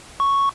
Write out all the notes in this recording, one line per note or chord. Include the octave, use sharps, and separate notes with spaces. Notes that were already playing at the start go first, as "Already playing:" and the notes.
C#6